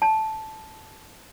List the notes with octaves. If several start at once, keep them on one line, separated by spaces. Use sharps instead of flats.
A5